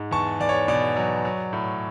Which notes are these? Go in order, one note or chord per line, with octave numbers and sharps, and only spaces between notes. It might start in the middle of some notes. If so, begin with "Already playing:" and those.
Already playing: G#2
E2 A5 C#6
E2 D5
C#5
B2 D5
F#3
F#3
A2